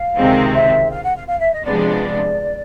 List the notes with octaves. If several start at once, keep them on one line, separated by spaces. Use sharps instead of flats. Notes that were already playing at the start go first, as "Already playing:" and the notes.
Already playing: F5
C#2 C3 D#3 G#3 C4
E5
F5
F#5
F5
F5
E5
D#5
C3 F3 G#3 B3 D4 D5
D5
D5